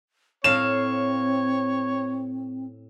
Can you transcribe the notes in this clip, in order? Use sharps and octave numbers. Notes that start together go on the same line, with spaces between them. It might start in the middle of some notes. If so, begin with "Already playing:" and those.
A2 C4 C#5 F5 E7